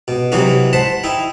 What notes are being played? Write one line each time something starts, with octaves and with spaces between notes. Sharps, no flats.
B2
C3 E3 F#3 D#4 F#4
C5 F#5 A5 B5
D#4 E4 G5